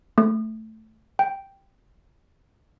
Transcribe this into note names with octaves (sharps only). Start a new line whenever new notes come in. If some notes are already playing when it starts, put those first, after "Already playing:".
A3
G5